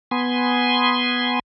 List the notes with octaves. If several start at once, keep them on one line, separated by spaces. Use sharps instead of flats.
B3 G#5 C6